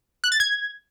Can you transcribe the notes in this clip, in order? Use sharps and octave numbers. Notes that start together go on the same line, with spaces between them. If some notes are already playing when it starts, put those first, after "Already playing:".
F#6
A6
G#6